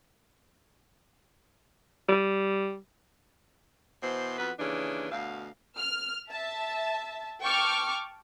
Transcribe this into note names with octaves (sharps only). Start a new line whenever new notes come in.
G3
B2 E3 C5
F2 B3 F#4 B4
D#2 C#3 E3 D4
D2 B2 F5
F6
E5 A5
G5 A5 C#6 D6 F6